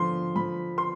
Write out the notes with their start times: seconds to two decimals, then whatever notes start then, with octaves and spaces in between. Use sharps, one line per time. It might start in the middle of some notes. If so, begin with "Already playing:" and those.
Already playing: D3 F3 C6
0.36 F3 B5
0.78 C6